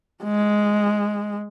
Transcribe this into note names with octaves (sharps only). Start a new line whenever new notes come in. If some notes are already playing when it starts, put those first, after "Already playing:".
G#3